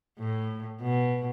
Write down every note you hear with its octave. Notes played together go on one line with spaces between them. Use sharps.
A2
B2